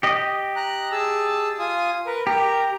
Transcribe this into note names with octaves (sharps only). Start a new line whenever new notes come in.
G4 D#5
A#5 F#6
G#4 A5 E6
F4 G#5 D#6
A#4 B4
G4 A#4 A#5